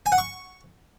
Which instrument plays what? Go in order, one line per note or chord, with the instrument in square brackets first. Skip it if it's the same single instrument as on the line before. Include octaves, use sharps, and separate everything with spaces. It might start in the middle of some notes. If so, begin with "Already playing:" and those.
[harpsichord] G#5
F#5
C#6